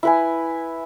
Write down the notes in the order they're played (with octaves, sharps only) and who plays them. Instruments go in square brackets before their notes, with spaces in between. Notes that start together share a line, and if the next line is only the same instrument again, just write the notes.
[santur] E4 B4 G#5